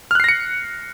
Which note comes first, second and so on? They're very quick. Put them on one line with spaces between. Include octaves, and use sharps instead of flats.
F6 F#6 C7 A#6 C#7